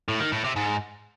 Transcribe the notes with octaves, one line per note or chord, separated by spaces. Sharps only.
A2
D#3
A2
C3
G#2